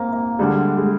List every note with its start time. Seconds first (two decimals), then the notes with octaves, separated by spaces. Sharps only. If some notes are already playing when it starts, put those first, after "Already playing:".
Already playing: G#2 A#3 C4
0.13 A#3
0.39 D2 D3 G3 G#3 D4
0.78 G#3